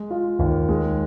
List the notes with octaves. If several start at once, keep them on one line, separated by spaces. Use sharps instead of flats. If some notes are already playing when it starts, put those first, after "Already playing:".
Already playing: G#3
F4
D#2
G#3